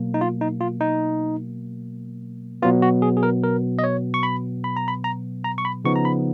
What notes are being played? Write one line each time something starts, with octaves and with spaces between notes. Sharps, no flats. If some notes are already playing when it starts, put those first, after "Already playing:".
Already playing: B2 F#3 A#3
D#4
F4
D#4
F4
D#4
B2 F#3 B3 F4
F#4
G#4
G#4
A#4
A#4
D#5
C#5
C#6
B5
B5
A#5
B5
A#5
A#5
C#6
B5
C#3 F3 B3 D#4 C#6
A#5
B5